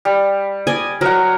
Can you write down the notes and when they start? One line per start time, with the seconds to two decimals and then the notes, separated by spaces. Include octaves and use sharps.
0.05 G3
0.67 D5 D#5 G#5
1.01 F#3 A#4 F#5